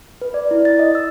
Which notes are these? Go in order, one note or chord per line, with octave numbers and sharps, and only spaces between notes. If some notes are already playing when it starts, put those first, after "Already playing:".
B4
D5
E4
A6
D#5
E6